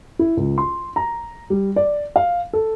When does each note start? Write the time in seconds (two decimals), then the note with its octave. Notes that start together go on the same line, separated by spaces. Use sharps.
0.19 E4
0.37 C#2
0.58 C6
0.96 A#5
1.50 G3
1.76 D5
2.16 F5
2.53 A4